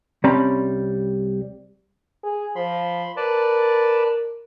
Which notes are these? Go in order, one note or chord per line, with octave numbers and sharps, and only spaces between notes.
C2 G3 C4 C#4 A#5 B5
G#4
F3 B5 C6
A#4 B4 D5 A5